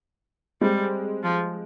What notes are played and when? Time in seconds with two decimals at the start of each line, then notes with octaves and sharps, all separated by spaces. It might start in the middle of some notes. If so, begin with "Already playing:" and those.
0.61 G3 G#3 C4
1.23 F3